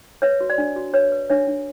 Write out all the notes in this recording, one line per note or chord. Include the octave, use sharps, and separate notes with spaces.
B4 C#5 E5
F#4
D5
D4
F#4
B4 C#5
B4
D4 C#5 E5
D4